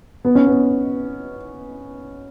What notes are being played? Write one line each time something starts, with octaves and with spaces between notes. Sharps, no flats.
B3
C#4
B3